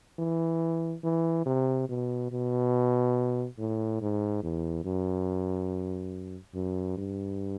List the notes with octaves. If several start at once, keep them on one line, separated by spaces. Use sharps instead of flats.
E3
E3
C3
B2
B2
A2
G#2
E2
F#2
F#2
G2